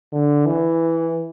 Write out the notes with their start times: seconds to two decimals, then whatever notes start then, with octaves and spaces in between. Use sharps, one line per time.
0.12 D3
0.46 E3